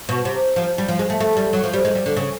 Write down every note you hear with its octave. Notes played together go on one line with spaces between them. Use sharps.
B2
C3
F3
G3
F3
G#3
A3
A3
G3
F#3
F3
G3
G#3
G3
D3
C#3